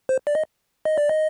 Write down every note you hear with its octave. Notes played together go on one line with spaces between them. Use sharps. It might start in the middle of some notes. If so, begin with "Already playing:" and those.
C5
D5
D#5
D#5
D5
D#5